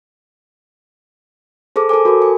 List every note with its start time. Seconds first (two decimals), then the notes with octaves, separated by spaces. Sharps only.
1.76 G#4 A4 C5 D6
1.89 A4 A#4 C5 G#5 D6
2.05 F#4 A#4
2.22 G#5